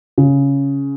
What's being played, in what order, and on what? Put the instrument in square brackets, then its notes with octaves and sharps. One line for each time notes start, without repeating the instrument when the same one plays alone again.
[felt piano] C#3